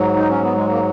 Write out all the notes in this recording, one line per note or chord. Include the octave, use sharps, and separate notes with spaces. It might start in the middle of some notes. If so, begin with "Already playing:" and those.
Already playing: G#2 F#3
D#4
C#4
B3
G#3
A#3